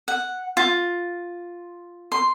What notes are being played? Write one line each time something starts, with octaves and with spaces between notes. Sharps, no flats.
F#5
F4
C6